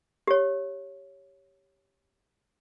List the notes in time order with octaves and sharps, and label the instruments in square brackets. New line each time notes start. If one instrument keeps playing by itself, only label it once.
[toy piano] G4 C#5